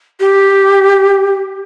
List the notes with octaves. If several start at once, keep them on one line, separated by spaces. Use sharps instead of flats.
G4